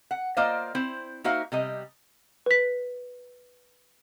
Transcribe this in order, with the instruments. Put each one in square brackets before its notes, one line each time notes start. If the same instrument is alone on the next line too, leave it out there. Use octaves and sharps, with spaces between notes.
[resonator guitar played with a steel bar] F#5
A#3 F4 C5 D5 D#5 F5
C4 E4 C5
A#3 D#4 F#4 C5 E5 F5
C3 G3 D#5
[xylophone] B4 B6